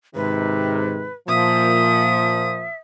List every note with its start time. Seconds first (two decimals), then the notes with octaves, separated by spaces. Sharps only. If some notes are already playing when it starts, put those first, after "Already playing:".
0.15 G#2 C3 D#3 B4
1.28 A#2 F3 E5 D#6